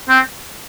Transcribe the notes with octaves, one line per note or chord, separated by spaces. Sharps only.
C4